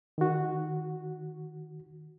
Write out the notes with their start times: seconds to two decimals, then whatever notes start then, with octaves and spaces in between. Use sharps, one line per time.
0.18 D#3 F#4